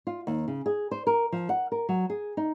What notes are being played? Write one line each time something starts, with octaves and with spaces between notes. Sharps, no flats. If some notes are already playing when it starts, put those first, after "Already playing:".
F4
D#2
C#3
G#4
C5
A#4
F3
F#5
A#4
F#3
G#4
D#4